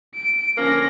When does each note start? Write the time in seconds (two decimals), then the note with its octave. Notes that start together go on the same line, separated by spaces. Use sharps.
0.15 D7
0.58 D3 F3 A#3 C#4 A#6